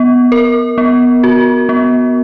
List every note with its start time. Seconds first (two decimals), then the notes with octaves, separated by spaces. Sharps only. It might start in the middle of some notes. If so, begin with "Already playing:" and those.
Already playing: B3
0.32 A#4
0.78 B3
1.23 F#4
1.69 B3